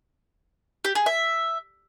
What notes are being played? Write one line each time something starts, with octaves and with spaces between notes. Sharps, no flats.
G4
G#4
E5